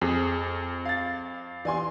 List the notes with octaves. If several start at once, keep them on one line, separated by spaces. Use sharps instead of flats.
F2 G#4
F5 A6
E3 D5 G#5 C6